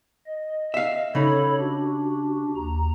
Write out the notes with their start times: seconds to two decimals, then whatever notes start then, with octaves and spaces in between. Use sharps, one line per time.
0.26 D#5
0.74 E5 F5
1.15 C#3 D#4 A4 C#5 B5
1.58 D4 F#4 G4
2.56 D#2 A#5